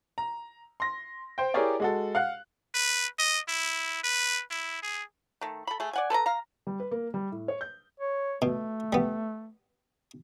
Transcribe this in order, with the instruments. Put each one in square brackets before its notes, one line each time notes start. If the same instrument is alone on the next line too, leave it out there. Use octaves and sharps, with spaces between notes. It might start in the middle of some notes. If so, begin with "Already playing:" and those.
[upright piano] A#5
C6 A#6
C5 G5
E4 G4 G#4 A#4 C#5 D5
G#3 F#4 A4
F5 F#5 F#6
[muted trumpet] B4
D#5
E4
B4
E4
G#4
[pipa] D#3 A3
A4 B5
A3 G#4
D5 F#5 G#5
A4 B4 A5 A#5
F5 A#5
[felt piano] G3
B4
A#3
G3
A2
C#5
G6
[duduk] C#5
[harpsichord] B2 [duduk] A3
[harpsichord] G3 B3